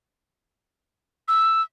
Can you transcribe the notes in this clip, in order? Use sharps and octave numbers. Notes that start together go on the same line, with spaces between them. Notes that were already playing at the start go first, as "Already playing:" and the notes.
E6